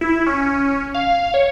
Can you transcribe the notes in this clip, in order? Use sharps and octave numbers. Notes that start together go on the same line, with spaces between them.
E4
C#4
F5
C#5